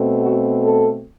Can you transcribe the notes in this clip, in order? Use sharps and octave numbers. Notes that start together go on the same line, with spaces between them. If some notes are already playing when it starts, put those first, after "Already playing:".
Already playing: B2 A3 C4
F#4
A4